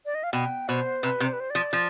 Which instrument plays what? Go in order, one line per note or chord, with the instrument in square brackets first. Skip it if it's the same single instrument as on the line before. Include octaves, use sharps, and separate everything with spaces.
[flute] D5
D#5
F5
[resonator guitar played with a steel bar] B2 [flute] G5
[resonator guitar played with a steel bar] B2 [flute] C5
[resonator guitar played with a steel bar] C3 [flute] B4
[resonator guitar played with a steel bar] C3
[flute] C5
B4
C5
[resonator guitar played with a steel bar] F3 [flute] D5
[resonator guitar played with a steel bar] F3